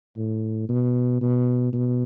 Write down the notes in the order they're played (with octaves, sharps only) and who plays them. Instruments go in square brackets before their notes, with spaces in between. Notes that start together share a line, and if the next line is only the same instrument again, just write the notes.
[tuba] A2
B2
B2
B2